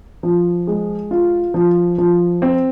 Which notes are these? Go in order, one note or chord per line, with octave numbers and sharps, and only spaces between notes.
F3
G#3
F4
F3
F3
C4